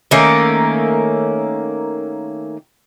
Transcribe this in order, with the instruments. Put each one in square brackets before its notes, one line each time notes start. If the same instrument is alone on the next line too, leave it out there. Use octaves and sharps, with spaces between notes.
[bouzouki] D#3 A3 A#3 C#4